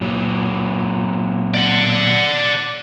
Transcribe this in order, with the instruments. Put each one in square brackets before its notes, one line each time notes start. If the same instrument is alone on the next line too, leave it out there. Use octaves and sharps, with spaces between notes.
[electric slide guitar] A#2 F#3
[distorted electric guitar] D5 F#5